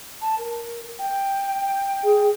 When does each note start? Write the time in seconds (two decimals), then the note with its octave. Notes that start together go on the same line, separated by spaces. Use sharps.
0.21 A5
0.38 A#4
0.99 G5
2.04 G#4